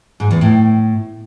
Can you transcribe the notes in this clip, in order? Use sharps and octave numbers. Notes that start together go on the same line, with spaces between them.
G#2
E2
A2